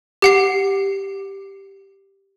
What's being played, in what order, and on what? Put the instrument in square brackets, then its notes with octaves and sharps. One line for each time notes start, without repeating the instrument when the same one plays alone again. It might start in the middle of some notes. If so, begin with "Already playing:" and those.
[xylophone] G4 F#5 C7